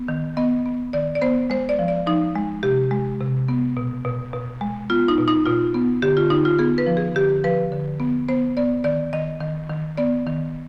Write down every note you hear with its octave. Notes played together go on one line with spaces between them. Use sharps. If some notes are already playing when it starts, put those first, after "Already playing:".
Already playing: B3
D#3
B3 D#5
B3
D#3 D5
D5
B3 C5
G#3 C5
D5
F3
D5
F3 D#4
G#3
C3 G4
G#3
C3
B3
B2
B2
B2
G#3
B3 F4
D#4
B2
D#4
B2 F4
B3
D3 G4
F4
D3 D#4
F4
B3 G#4
B4
F3
G#4
D3 G4
F3 B4
D3
B3
B3 C5
B3 D5
D#3 D5
D#3 D#5
D#3
D#3
B3 D5
D#3